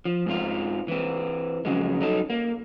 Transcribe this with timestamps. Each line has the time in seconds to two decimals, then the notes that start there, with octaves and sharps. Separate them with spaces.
0.05 F3
0.26 G#2 C4 F4
0.88 E3 C4
1.65 F2 C#3 F#3 G#3
2.01 F#3 D#4 A4
2.30 A#3